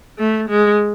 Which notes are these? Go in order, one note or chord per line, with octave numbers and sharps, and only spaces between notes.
A3
G#3